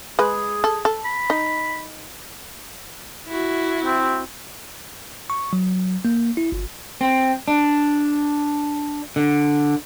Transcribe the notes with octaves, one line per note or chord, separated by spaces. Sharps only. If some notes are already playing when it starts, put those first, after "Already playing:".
G#3 G#4 B4
A4
A4
B5
D#4
E4 F#4
C4
C#6
F#3
A#3
E4
G1
C4
D4
D3